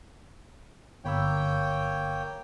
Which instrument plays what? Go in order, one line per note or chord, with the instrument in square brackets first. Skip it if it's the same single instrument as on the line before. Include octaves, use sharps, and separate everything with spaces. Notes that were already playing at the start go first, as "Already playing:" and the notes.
[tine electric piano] G1 B5 E6 [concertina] A#3 C#5 G5